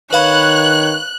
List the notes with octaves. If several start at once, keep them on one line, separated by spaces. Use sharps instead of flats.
D#3 B4 C#5 F5 B5 F#6